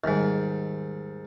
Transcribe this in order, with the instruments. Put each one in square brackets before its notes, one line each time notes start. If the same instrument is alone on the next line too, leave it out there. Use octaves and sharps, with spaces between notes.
[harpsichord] D#2 G#2 [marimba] D#3 G3 G#3